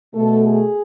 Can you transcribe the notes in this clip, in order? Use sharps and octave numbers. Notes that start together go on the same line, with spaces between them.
B2 A3 A4
G#4